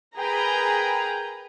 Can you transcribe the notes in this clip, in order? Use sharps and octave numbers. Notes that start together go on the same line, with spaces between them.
G#4 A#4 B4 G5 A#5 B5